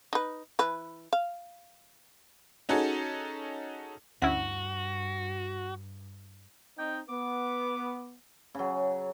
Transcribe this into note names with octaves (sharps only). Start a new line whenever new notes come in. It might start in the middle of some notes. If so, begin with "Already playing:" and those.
D#4 B4
E3 B4
F5
C#4 D#4 F#4 G#4 A4
D2 G2 C#4 E4 F#4 F#5
C4 D#4 G5
B3 D6
C#3 F#3